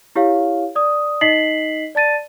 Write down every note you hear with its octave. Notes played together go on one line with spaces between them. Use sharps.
E4 G4 C#5 F5
D5 D#6
D#4 D#5 B6 C7 F#7
D5 A5 A6 D#7